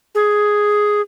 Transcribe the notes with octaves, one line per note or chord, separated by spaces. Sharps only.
G#4